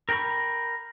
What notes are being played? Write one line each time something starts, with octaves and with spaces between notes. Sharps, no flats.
A#4 G5 A#5 B5 C#6